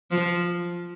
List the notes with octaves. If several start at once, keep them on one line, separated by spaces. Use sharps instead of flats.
F3